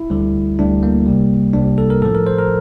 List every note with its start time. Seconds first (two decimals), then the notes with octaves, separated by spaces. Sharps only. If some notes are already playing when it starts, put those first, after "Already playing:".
Already playing: E4
0.10 D2 D3 G3
0.59 D2 D3 G3 D4
0.83 A#3
1.06 C2 C3 G3
1.54 C2 C3 G3 D4
1.78 A4
1.90 A#4
2.02 A2 F3 A4
2.15 A#4
2.27 C5
2.38 A#4